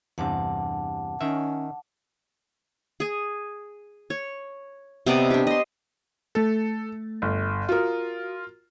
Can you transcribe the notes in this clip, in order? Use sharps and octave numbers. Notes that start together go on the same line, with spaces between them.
E2 G2 C3 F#5 A5 D6
D#3 C#4 E5
G#4 G#5
C#5
C3 B3 D5 D#5
D4 G4
D#5 C6
A3 A4 A6
G1
F4 F#4 A#4 D#6